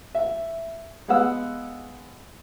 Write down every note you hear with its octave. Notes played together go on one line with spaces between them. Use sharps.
E5
G#3 B3 F5 F#5 E6